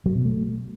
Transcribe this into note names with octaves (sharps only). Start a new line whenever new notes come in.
F#3
B2
A3